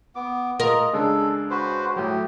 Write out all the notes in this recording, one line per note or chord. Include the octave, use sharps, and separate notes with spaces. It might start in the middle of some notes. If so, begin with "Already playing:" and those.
B3 D6
F4 A#4 D#5
C#3 G#3 D4 A4
F#4 B4 C5
A2 F#3 G4